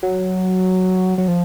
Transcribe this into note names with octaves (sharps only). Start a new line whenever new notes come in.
F#3
F#3
F3